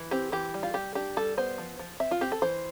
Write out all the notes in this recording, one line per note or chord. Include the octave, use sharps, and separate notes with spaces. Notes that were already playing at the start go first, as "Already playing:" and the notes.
Already playing: E3
C4 G4
E3 G4
G3
F4
G3 G4
D4 G4
G3 A4
B3 C5
F3
F3
C4 E5
F4
C4 G4
A4
E3 C5